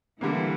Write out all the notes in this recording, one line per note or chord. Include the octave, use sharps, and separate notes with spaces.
D3 E3 G3 A#3